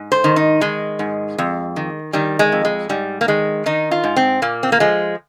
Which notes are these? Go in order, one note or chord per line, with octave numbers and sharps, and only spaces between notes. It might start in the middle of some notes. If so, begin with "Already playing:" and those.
Already playing: G#2
C5
D#3
D#4
D#3 G#3
G#2
F2
D#3
D#3 G3
G#3
F2
G#3
G#2 G3
A#3
D#3 G#3
D#3 D#4
F4
G#2
C4
A#2 A#3
C4
A#3
F3 G#3